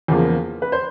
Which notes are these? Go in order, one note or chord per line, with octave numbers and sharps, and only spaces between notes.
E2 C#3 F3 A#3
B4
C5